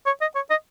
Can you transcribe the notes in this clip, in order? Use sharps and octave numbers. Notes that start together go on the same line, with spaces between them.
C#5
D#5
C#5
D#5